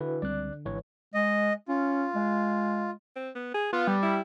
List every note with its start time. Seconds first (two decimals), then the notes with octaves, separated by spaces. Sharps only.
0.01 D3 E4 F#4 B4
0.22 C#2 G3 C4 D5 F#6
0.66 G#1 E3 B4 C#5
1.14 G#3 D#5
1.68 C#4 F4
2.15 G#3
3.16 C4
3.35 B3
3.54 G#4
3.73 B3 F4
3.87 G3
4.03 E4